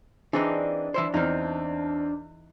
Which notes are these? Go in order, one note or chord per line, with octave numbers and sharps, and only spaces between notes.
E3 C4 D4 D#4 G#4
E3 E4 C5
E2 E3 C4 D#4 F6